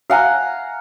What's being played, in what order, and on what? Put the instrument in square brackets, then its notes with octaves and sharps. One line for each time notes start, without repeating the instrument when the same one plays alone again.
[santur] F5 F#5 G#5 A#5